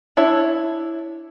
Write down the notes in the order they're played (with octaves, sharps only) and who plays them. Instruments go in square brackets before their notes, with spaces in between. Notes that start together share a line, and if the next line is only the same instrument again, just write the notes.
[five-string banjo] D4 E4 C#5 E5